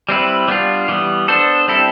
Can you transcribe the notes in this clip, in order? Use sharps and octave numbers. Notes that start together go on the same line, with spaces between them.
G3 C4 E4 B4
G3 B3 D4 F4
E3 G3 B3
B3 D4 A4 C5
G3 C4 E4 A4